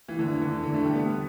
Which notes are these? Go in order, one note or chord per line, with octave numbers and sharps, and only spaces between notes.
E3
D3
E3
D3
D3
A3
G3
B3